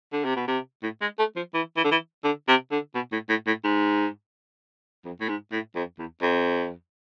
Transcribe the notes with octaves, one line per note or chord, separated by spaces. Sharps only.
D3
C3
B2
C3
A2
G#3
A3
F3
E3
E3
D3
E3
D3
C3
D3
B2
A2
A2
A2
G#2
F2
A2
G#2
A2
F2
E2
F2